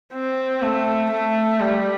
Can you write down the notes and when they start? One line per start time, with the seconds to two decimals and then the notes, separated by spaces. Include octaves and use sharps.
0.13 C4
0.62 A3
1.11 A3
1.60 G3